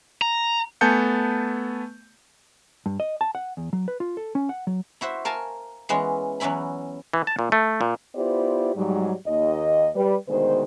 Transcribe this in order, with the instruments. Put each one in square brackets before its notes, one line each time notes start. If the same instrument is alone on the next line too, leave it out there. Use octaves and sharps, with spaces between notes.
[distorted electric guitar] A#5
[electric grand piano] A3 B3 G#5 A5 G6 C#7
[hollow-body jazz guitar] G2
D#5
A5
F#5
E2
F#3
B4
F4
A4
C#4
F#5
F#3
[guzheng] E4 F#4 C5 E5
A#4 F5 G#5 A5
E3 G#3 B3 C#4
E2 F#3 C#4 E4 B5
[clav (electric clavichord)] E3
A5
A#2
A3
A#2
[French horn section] B3 E4 F4 G4 C5 D5
G#2 F#3 G3
D#2 D#5
G3 B4
D2 B2 D#3 G#3 C5